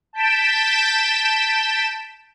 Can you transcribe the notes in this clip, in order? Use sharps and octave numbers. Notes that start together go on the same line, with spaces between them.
A5 G6 B6 D7 E7